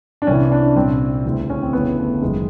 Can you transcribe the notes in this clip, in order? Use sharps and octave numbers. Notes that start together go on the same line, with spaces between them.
D4
C2 C3 E3 C#4
D4
C2 A#2 C4
D2 C#3 E3
C#4
C4
G1 F2 C#3 E3 B3
A3
F#1 F#2 D#3 G#3